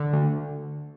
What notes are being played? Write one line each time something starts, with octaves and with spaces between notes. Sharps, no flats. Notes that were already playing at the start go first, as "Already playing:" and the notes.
Already playing: D3
D2